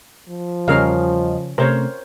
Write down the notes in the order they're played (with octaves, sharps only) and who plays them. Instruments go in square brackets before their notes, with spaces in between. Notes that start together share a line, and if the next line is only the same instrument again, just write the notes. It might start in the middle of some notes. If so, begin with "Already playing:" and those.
[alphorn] F3
[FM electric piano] E2 G3 D#5 [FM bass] C#3 [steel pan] C#4 A#4 F5
[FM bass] C3 [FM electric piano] A3 C4 C#4 [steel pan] A#4 C5 C#5